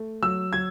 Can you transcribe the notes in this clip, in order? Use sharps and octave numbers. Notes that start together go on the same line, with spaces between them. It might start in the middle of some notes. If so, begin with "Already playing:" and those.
Already playing: A3
F#3 E6
F#3 G#6